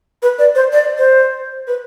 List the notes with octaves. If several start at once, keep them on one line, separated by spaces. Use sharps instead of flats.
B4
D5
C5
D5
C5
B4